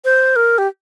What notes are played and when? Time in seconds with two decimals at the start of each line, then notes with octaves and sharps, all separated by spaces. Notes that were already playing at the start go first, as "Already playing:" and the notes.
0.05 C5
0.36 A#4
0.58 G4